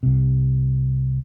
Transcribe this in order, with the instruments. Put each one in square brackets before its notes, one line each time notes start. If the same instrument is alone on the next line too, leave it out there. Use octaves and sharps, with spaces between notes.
[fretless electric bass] C2 C3